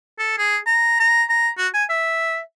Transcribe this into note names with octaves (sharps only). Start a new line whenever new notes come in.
A4
G#4
A#5
A#5
A#5
F#4
G#5
E5